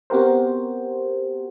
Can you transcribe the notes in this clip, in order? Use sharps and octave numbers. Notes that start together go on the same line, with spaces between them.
B3 C4 F#4 G4 A#4 C5